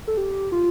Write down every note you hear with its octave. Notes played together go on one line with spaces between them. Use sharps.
A4
G4
F4